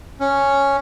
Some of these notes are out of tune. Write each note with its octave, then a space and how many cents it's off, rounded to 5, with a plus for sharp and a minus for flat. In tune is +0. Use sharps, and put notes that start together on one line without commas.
C#4 +0